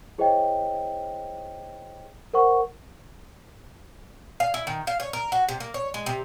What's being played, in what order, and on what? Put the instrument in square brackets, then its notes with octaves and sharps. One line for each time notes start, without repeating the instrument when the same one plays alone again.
[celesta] E4 G#4 C5 C#5 D#5 G5
A#4 C5 F#5 C#6
[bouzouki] F5
E4
D#3
F5
C#5
A#4
F#4
C3
A#3
C#5
G#3
C3